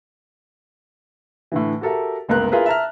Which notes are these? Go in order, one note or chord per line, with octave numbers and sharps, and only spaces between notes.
A2 D3 E3
F#4 G4 A4 A#4 E5
G1 C#2 A#3 B3 A#4 F#6
E4 F4 G#4 A#4 B4
E5 A5 A#5 F6